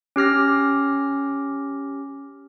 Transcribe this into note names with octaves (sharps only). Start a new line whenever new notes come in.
C#4 G4 F6 A#6